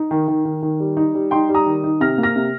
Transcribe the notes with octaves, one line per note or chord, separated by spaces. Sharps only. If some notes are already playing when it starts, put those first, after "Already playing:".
Already playing: D#4
D#3
D#3
D#3
D#3
G3
D#4
G3
D#4 G5 C6
G3
A#5 D#6
D#3
D#4
C3 F6 A#6
A#3
F6 A#6
C3